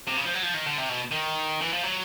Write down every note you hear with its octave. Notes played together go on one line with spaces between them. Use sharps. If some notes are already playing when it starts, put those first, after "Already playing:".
C3
C#3
F3
F#3
F3
D#3
D3
C3
B2
D#3
E3
F3
F#3